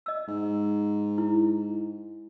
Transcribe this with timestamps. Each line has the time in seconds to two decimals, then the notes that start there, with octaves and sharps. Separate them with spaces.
0.06 D#5 E6
0.28 G#2
1.18 E4